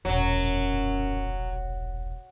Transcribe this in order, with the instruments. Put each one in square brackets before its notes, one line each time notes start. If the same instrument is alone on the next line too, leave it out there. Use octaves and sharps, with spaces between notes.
[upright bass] E1 A#1 [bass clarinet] F#2 [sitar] F#3